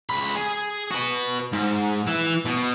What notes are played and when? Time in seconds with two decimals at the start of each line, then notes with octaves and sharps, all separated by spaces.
0.10 C#2 B5
0.35 G#4
0.91 F#4 B4
1.53 G#2
2.07 E3 E4
2.45 B2